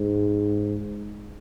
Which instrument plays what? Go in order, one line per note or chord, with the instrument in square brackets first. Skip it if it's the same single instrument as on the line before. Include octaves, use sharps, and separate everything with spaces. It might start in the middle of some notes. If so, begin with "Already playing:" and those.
Already playing: [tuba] G#2